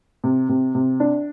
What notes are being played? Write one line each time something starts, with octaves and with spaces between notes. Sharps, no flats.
C3
C3
C3
D4